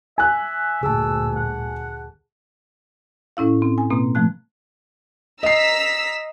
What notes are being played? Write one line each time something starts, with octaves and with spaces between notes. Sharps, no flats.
E5 G#5 F#6
G1 D2 A#2 G#4 A5 E6
F#5
A2 C#4 E4 F5
C4
G#5
B2 A#3 C4
F3 A3 F#6
D#5 A#5 E6 B6 C7